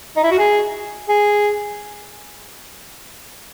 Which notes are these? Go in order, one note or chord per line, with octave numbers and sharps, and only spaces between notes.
D#4
E4
F#4
G#4
G#4